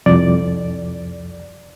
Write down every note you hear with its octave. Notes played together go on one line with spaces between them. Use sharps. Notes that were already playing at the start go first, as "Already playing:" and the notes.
C2 F2 D5